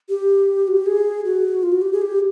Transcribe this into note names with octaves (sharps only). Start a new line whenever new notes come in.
G4
F#4
G4
G#4
F#4
F4
F#4
G4
G#4
G4